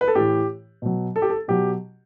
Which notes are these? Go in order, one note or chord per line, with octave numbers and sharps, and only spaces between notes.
B4
A4
A2 E3 G4
B2 F#3
A4
G4
A4
B2 F#3 G4